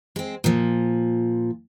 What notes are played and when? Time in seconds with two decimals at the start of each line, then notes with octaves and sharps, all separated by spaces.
0.16 G#3 C4
0.44 A#2 F3